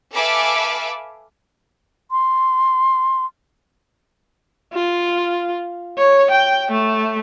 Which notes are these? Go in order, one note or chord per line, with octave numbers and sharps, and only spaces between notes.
A4 B4 E5 F5 G#5 D6
C6
F4
C#5
G5
A3